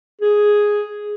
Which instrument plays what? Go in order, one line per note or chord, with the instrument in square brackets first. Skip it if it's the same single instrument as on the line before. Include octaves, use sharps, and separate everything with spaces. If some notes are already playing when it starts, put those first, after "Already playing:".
[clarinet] G#4